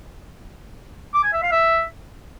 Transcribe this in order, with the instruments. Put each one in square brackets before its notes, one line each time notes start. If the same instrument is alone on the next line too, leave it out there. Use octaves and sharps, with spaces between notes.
[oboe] D6
G#5
E5
F5
E5